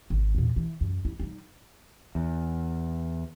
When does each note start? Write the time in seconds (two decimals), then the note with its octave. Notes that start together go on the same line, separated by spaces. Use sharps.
0.10 G#1
0.35 E2 A#2
0.56 E3
0.81 F#2
1.05 E4
1.20 G3 D#4
2.15 E2